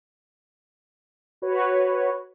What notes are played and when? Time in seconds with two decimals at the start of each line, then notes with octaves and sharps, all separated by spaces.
1.42 F#4 B4 C#5